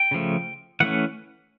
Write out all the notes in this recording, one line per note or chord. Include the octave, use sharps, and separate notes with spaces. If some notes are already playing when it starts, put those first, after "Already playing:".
Already playing: G5
C#3 F3 A3
E3 A3 C#4 F#5